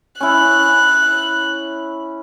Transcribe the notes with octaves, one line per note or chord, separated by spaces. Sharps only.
C#4 E4 F#6